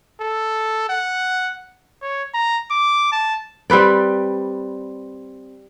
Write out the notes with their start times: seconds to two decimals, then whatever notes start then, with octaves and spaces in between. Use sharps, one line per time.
0.20 A4
0.89 F#5
2.02 C#5
2.34 A#5
2.71 D6
3.12 A5
3.70 G3 C4 B4 D5